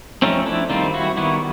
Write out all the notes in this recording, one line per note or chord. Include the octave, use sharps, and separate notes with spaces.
F3 A3 C4 C#4 D#4
D4 E4
D#3 G3 C4 D#4 F4
E4 F#4
D#3 G3 B3 E4 F#4